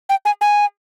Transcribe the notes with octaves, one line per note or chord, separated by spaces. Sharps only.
G5
G#5
G#5